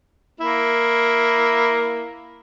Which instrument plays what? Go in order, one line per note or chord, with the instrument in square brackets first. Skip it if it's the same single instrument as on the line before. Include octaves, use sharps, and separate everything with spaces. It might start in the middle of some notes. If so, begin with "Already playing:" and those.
[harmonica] A#3 E4